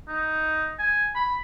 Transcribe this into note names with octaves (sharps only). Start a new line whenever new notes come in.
D#4
G#5
B5